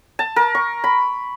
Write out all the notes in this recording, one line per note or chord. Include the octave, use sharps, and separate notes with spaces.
A5
A#4
C#6
B5